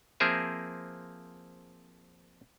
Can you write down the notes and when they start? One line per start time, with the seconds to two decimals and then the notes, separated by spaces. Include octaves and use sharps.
0.20 F3 A#3 C4 G#4 A#4 E5